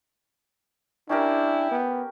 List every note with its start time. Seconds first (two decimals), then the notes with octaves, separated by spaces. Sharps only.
1.09 C#4 D4 E4 G4 A#4
1.71 B3